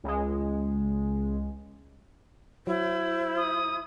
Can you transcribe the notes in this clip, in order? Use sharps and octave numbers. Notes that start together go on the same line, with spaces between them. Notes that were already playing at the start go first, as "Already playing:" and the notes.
C#2 G#3
F#3 E4 C5
D#6